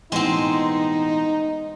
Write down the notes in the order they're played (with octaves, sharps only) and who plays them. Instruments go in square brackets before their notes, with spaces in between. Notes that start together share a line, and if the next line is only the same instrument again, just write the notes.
[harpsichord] A1 B2 [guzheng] G#3 C4 [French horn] D#4